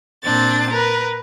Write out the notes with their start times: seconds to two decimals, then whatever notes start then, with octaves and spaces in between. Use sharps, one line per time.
0.22 A#2 C4 D4 A6
0.70 A#4 B4